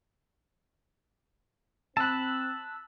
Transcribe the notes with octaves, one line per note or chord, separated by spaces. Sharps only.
C4 A5 B5 E6 F#6